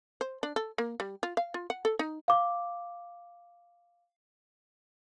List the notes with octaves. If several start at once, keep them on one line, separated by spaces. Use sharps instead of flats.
C5
D4
A4
A#3
G3
F4
F5
F4
F#5
A4
D#4
F5 D6